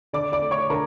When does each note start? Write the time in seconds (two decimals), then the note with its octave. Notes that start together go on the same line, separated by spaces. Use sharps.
0.13 D3 D5 D6
0.32 D5 D6
0.41 A3
0.51 C#5 C#6
0.70 D3 A#4 A#5